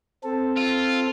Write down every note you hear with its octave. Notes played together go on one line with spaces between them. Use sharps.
C4 A4
F4